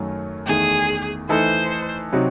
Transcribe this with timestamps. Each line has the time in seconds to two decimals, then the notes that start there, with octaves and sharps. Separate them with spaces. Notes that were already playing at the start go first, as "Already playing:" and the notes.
Already playing: F#2 D#3 F#3 A3
0.46 E2 D#3 A3 G#4
1.29 E3 A3 D#4 A4 C5
2.12 C3 F#3 C4 D#4 F#4